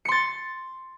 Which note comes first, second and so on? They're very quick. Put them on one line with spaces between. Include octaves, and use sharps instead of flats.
C#7 C6 A6